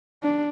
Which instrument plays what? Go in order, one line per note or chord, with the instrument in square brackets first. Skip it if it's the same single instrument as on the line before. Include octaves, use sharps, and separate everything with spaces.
[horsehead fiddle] D4